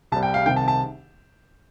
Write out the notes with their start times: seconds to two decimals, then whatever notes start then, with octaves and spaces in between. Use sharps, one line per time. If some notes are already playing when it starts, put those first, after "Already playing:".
0.12 C2 C3 G3 A5
0.23 G5
0.34 F5
0.46 C2 C3 D#3 G5
0.56 A5
0.68 A5